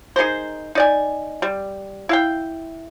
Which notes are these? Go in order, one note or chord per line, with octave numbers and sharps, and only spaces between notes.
D#4 G#4 A#4 C5
D#4 D5 G#5
G3
E4 F5 G5